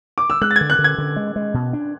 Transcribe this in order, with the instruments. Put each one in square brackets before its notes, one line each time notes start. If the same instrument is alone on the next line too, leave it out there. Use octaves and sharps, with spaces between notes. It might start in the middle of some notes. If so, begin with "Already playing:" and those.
[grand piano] D6
E6
[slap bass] G#3 [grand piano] F#6
[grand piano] A6
G#6
[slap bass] D3
[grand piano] F#6
[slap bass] D3
[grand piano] G#6
[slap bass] D3
G#3
G#3
B2
D4